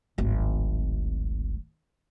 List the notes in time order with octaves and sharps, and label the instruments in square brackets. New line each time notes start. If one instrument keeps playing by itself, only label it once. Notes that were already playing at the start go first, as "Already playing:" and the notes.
[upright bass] D1 G#1